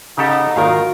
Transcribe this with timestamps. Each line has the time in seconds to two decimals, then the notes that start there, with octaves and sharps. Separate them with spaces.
0.18 C#3 D#4 G4 A4 F#5
0.56 G#2 D#3 F4 F#4 A#4 F5